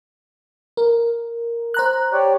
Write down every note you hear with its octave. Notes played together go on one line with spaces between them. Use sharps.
A#4
C5 A#5 F#6
G4 C#5 D5